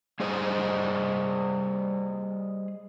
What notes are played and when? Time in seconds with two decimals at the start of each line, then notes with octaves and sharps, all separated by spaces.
0.20 G3 G#4 C5 D#5